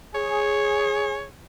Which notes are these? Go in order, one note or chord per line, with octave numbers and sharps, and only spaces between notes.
G#4 C#5